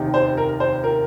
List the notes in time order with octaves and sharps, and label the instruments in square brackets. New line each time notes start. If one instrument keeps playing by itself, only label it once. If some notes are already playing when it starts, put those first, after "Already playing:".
Already playing: [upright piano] F1 D#2 D#3
C5
A#4
C5
A#4